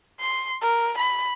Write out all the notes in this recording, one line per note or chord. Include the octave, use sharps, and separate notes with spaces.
C6
A#4
B5